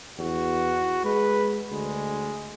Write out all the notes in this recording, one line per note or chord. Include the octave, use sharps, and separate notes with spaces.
E2 F#4
G#3 B4
D2 G#3